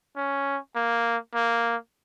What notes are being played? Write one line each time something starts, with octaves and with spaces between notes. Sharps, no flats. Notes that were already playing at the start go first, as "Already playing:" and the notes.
C#4
A#3
A#3